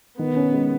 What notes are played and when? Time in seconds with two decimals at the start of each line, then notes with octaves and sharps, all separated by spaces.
0.19 D#3 B3
0.36 C#4
0.53 G#3